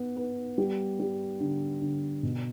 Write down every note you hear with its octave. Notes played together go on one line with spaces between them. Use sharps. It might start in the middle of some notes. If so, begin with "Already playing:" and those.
Already playing: B3
B3
G3
G3
D3
D3
B2